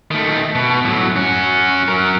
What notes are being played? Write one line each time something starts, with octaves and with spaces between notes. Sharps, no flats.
D#3 A3
B2
A2 F#3
C#4 F#4
F#3 A#4